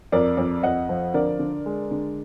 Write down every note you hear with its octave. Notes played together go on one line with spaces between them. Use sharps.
F2 A#4 D5
F2
F2 D#5 F#5
F3
D3 A#4 D5
D3
G#3
D3